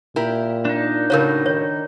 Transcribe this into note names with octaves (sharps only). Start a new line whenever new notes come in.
A#2 E4 G4 A#4
D4 D#4
A2 C#3 F#4 A#4 C#5
D#3 C#5